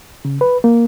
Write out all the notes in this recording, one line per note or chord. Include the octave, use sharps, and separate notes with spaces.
C#3
B4
A#3